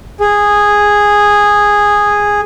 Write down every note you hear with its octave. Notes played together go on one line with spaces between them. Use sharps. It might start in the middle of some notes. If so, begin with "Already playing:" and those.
G#4